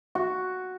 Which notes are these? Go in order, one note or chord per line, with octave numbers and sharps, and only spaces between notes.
F#4